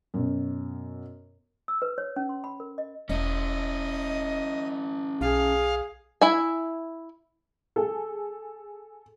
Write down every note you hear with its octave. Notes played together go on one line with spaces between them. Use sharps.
F#2 B2
E6
B4
C#5
C#4
C6
B5
A#4
D#5
E1 C#4 E4 D#5
B1 G#4 F5
E4 E5 G#5
G#4 A4